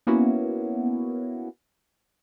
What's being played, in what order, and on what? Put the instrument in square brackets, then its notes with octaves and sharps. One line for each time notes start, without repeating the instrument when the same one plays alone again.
[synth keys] A#3 B3 C#4 E4 F#4